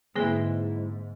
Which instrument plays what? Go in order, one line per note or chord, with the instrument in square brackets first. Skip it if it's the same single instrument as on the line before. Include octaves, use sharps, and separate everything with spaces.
[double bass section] G#2 [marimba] D3 A#3 G#4 [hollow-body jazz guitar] G#3 C4 E4